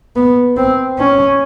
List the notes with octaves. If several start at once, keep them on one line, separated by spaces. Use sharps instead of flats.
B3
C4
C#4